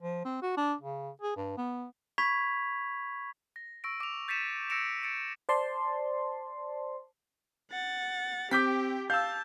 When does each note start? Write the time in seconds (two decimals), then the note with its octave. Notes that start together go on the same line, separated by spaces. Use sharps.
0.02 F3
0.25 C4
0.42 F#4
0.57 D4
0.81 C#3
1.22 G#4
1.36 G2
1.57 B3
2.18 B5 C#6 G#6 B6 F7
3.56 A#6
3.84 C#6 E6 A#6 D7
4.00 D6 F7
4.28 G6 A6 B6 C#7 D#7 E7
4.69 E6 A#6 C#7 D7 E7 F7
5.03 A6 C#7 D7
5.49 C5 D5 A5 C6
7.71 F#5 A6
8.51 C4 G4 G5 D6 G6 B6
9.10 F5 A5 E6 G6